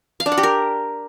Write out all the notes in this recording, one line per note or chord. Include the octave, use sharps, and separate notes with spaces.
F5
D4
F#5
G4
A#4